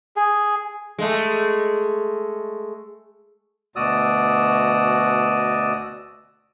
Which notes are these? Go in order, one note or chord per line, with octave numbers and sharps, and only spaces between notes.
G#4
G#3 A3
D2 B2 F#4 D5 D#6 E6